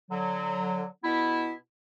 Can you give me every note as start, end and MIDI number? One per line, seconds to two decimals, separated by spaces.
0.10 0.84 50
0.10 0.84 54
1.03 1.52 47
1.03 1.52 59
1.03 1.52 64